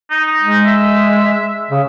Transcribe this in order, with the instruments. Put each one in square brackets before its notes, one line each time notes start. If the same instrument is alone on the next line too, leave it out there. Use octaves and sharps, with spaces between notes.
[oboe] D#4
[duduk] G#3
[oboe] E5
[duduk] C#3